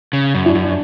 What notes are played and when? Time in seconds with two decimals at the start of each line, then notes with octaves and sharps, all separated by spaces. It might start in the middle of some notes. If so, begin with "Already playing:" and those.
0.13 C#3
0.35 F#2
0.45 E4
0.48 D4
0.55 F#2
0.62 D4